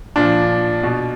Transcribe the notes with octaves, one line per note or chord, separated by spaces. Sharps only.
A#2 F3 D4
B2